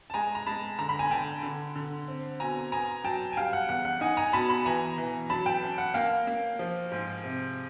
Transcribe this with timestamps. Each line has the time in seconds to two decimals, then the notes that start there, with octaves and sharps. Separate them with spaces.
0.10 A5
0.14 G#3 G#5 A#5
0.35 A#5
0.46 G#3 A5 B5
0.79 D3 A#5
0.89 B5
0.99 G#5 A#5
1.11 D3 G5 A5
1.43 D3
1.76 D3
2.08 C4
2.40 B2 G#5 A#5
2.72 B3 G#5 A#5
3.04 F#3 G5 A5
3.32 G#5
3.37 G3 F5 G5
3.53 F#5
3.69 E2 F#5
3.85 F#5
4.01 D#4 F#5 G#5
4.17 G#5 A#5
4.33 B2 A5 B5
4.49 A5 B5
4.66 E3 G#5 A#5
4.98 E3
5.30 F#3 A5 B5
5.46 G5 A5
5.63 C#4
5.78 F#5
5.94 A#3 F5 G5
6.27 A#3
6.59 F3
6.92 G#2
7.23 C3